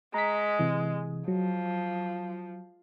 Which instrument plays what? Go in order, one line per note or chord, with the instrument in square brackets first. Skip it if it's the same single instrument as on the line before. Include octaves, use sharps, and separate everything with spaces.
[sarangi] G#3 [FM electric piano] A#5 B6
[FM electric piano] C3 E3
[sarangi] F3 [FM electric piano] F#3